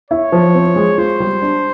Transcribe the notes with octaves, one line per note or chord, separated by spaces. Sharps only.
E4 C#5
F3
C4
G#3
F4 C5
G3
D4